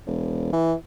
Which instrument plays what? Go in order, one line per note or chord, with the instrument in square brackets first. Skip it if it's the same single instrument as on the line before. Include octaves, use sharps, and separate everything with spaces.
[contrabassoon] E1
E3